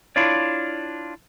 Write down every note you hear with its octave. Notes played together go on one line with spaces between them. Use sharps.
D4 E4 F4 C#5 D5